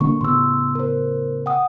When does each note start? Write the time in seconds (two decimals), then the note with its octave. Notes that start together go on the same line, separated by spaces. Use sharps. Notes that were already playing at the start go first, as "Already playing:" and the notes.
0.01 D3 A#3 D4 C#6
0.21 A2 C#3 B3 C6 E6
0.75 A#4 C5
1.46 F#5 G5 D#6